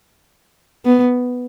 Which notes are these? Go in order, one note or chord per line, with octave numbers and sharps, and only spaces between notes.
B3